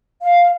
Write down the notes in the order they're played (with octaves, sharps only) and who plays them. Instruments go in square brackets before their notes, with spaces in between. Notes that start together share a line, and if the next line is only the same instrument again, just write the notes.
[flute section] F5